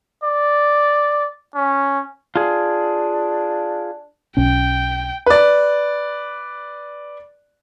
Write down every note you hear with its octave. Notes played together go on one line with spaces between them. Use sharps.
D5
C#4
D4 F4 G#4
B1 B2 C#4 G5
B4 D5